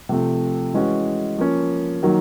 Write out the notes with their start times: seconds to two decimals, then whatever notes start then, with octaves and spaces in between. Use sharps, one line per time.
0.09 C3 F3 A3 C4
0.74 E3 G#3 C#4 F#4
1.39 F3 A#3 C#4
2.03 D#3 F#3 A#3